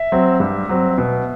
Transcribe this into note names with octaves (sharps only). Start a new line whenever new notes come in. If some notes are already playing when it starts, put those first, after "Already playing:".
Already playing: E5
F#3 C4
G2
F#3 C4
B2